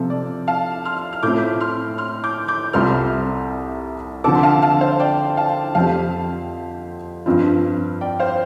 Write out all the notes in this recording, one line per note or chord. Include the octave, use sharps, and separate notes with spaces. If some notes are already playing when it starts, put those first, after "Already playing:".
Already playing: C3 F3 C4 F4 A4
D5
F5 A5
C6 F6
F6
A2 A3 C4 F4 D6 G6
C6 F6
C6 F6
D6 G6
D6 G6
C2 C3 G3 F4 A4 C6 F6
D3 F3 C4 A4 A5 D6
C6
F5 A5
F5 A5
C5 F5
D5 G5
F5 A5
F2 F3 C4 G4 F5 A5
G2 F3 C4 F4
D5 G5
C5 F5